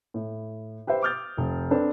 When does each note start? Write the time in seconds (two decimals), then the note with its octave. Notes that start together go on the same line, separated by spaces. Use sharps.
0.14 A2
0.87 G4 B4 C5 E5 G5
1.02 D6 D#6 F6 G6 A6
1.37 F1
1.71 C4 D4 A4 B4